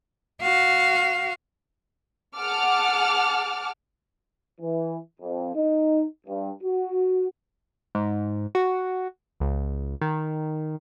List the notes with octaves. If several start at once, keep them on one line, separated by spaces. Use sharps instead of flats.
F#4 F5
G#4 F#5 A5 D6 F6
E3
F2
D#4
G2
F#4
G#2
F#4
C#2
D#3